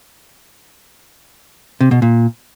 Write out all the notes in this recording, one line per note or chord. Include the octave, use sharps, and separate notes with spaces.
C3
B2
A#2